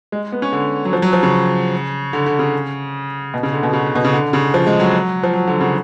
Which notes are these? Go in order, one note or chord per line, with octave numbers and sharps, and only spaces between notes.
G#3
B3
C#4
D3
F#3
F3
F#3
F3
C#3
D3
D3
C#3
B2
C#3
D3
B2
C#3
B2
C#3
D3
C#3
F3
G#3
F#3
F3
F#3
D3
C#3